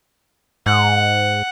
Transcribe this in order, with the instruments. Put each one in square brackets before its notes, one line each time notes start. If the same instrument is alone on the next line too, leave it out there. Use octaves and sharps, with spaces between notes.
[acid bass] G#2 [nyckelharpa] F#5